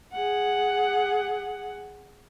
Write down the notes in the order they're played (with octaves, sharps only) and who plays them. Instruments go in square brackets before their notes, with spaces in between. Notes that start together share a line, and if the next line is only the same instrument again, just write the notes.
[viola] G#4 F#5